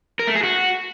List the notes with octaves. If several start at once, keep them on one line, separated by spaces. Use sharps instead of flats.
A#4
A3
G#4
F#4